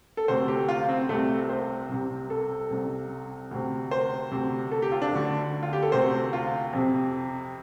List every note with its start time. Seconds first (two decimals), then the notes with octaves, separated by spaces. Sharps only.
0.17 A4
0.28 D2 C3 C5
0.48 G4
0.69 F4
0.89 C4
1.09 C2 C3 A3
1.50 C5
1.89 C2 C3
2.30 A4
2.71 C2 C3
3.51 D2 C3
3.91 C5
4.31 D2 C3
4.71 A4
4.82 G4
4.92 F4
5.02 D4
5.12 D2 D3
5.63 F4
5.73 G4
5.83 A4
5.92 D2 C3 C5
6.33 F4
6.73 F2 C3